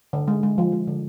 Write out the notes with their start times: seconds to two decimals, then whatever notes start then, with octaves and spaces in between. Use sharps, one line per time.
0.13 D3
0.28 G#3
0.43 G#3
0.58 F3
0.72 G#3
0.88 D3